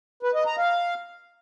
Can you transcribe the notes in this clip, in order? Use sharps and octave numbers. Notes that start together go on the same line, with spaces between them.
B4
D#5
A#5
F5